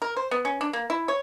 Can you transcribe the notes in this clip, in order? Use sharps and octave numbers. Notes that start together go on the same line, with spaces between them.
A#4
C5
B3
C#4
D4
A#3
E4
C#5